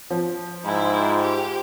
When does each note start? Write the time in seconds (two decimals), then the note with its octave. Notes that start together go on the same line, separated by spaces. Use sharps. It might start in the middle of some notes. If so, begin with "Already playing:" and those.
0.10 F3
0.65 G#2 E4 F4 C5 G5
1.20 G4